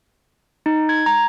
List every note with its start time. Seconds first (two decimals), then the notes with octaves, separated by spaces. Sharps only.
0.66 D#4
0.89 G#6
1.06 A#5